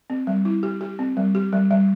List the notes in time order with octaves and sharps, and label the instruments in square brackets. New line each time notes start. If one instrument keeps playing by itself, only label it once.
[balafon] C4
G3
E4
G4
G4
C4
G3
G4
G3
G3